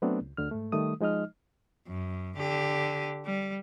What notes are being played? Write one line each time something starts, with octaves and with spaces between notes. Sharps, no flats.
F#3 A3 B3 C4 D4
C#2
D2 D3 F6
G#2 A3
D#3 G3 A3 D#6
F3 G#3 D#4 D#5 F6
F#2
D3 G4
G3